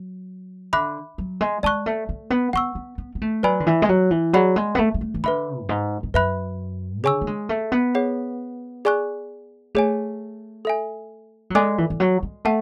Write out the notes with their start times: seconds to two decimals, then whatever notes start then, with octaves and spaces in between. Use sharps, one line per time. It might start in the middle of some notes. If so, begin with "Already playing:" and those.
Already playing: F#3
0.73 D3 E5 B5 D6 F#6
1.18 F#3
1.41 G#3
1.63 G#3 D5 A5 C#6 F#6
1.86 A3
2.09 A3
2.30 B3
2.53 B3 F#5 C#6 E6
2.75 B3
2.98 B3
3.15 B3
3.22 A3
3.43 F#3 B4 D5 G#5 B5
3.60 D3
3.67 E3
3.82 G#3
3.89 F#3
4.11 E3
4.33 F#3 G#4 D5 F#5 B5
4.56 G#3
4.75 B3
4.78 A3
4.94 G#3
5.01 A3
5.14 E3
5.24 D3 B4 E5 B5
5.63 F#2
5.69 G#2
6.03 G#2
6.14 F#2 B4 E5 B5 F#6
7.04 D3 G#4 C#5 G#5 C#6 E6
7.21 A3
7.27 G#3
7.49 A3
7.72 B3
7.95 G#4 C#5 F#5
8.85 G#4 D5 G#5 C#6 F#6
9.74 A3 G#4 C#5 G#5
10.65 A4 E5 G#5
11.50 F#3
11.55 G#3 A4 D5 G#5 D6 F#6
11.78 E3
11.90 E3
12.00 F#3
12.23 G#3
12.45 A3 F#5 A5